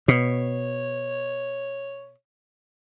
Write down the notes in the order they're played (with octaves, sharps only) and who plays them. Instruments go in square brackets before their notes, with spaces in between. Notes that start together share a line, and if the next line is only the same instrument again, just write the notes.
[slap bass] B2 [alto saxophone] C#5